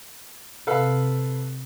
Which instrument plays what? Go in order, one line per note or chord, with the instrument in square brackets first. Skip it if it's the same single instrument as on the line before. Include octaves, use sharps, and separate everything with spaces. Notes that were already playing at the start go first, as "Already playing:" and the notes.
[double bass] C3 [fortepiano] A4 B4 F5